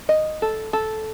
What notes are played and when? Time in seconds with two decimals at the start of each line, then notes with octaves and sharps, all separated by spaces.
0.09 D#5
0.42 A4
0.73 A4